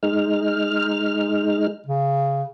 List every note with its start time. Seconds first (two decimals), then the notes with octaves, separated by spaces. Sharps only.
0.03 G#3 D#4 F6
1.86 C#3